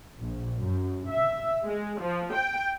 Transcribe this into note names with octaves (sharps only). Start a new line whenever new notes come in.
A#1
F#2
E5
G#3
F3
G5